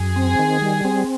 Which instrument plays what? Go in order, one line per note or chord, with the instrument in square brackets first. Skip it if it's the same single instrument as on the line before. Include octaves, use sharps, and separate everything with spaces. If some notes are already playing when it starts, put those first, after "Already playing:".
Already playing: [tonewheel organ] F#2 [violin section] G#4
[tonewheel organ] C4
D#3
G3
C4